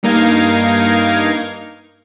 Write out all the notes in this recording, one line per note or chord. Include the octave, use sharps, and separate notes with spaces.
G2 A#3 D#4 A#4 F5 G#6